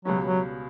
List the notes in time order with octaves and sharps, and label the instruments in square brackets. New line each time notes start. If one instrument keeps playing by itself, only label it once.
[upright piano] C#2 B2 G3 C#4 [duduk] F#3
[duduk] F#3